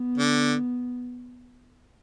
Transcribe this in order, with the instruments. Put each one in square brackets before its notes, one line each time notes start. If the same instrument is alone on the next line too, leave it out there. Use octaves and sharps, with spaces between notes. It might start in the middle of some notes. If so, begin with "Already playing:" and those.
Already playing: [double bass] B3
[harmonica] D3